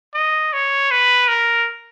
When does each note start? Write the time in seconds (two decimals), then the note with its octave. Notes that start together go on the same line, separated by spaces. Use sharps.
0.14 D#5
0.53 C#5
0.91 B4
1.28 A#4